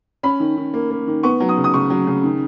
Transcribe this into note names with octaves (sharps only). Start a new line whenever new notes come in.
C#4 B5
D#3
D#3
A#3
A#3
D#3
B3 C#6
F#3
D#6
C#3
D#6
C#3 C#6
F#3
C#3
D#3